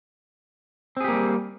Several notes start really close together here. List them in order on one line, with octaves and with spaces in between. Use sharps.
C4 G#4 G4 A#3 G3